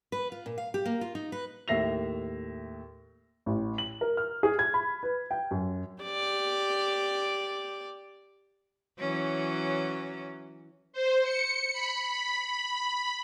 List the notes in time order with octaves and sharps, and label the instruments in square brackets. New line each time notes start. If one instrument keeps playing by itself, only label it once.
[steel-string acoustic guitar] B4
F4
A#2
F5
G4
A#3
F4
D#4
B4
[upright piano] D#2 A2 E5 A#6 C7 F7
A1
F#7
A#4
F6
G#4
G#6
B5
B4
G5
F#2
[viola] G4 D5
[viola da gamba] E3 F#3 C#4
[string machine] C5
C#7
B5
B5